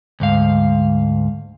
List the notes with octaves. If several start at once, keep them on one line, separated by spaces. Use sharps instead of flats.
D2 G#2 F5